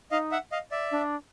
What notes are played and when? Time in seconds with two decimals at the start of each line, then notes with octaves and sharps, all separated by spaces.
0.11 D#4 D#5 F5
0.31 E5 F#5
0.52 D#5 F5
0.71 D5 E5
0.91 D4